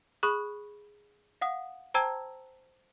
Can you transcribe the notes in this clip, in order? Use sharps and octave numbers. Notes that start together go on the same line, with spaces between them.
G#4 B5 C#6 D#6 F#6
F5 F#5 D#6
C5 G5 A5 A#5 E6 G#6